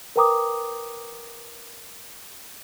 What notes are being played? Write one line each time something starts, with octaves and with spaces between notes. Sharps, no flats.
A#4 B4 G5 A#5 D6 D#6